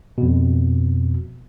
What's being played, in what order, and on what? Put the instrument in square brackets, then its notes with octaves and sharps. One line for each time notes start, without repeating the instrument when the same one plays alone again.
[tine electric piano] F2 B2